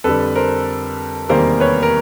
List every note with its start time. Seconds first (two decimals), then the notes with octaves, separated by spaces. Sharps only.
0.04 F2 D3 G3 A4 B4
0.35 A#4 C5
1.29 E2 C3 D#3 G3 A#3 A#4 C5
1.60 B4 C#5
1.83 A#4